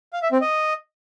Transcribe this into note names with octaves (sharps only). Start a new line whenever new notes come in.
F5
E5
C4
D#5